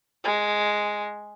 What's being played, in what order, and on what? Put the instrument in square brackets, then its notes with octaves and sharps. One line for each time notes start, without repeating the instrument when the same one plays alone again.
[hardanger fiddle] G#3